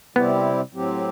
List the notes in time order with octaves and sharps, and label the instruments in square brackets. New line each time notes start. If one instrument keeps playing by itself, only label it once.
[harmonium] C3 G3 C4 E4 G4 [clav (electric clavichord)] B3
[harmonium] A2 F#3 C4 G4